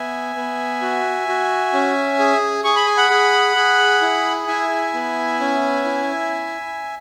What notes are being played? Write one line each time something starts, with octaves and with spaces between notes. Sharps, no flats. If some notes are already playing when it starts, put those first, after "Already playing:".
Already playing: B3 E5 G#5
B3
F#4
F#4
C#4
G#4
G#4 C#6
B5
G#5
F#5 B5
G#4
G#4
E4
E4 E5 G#5
B3
C#4
E4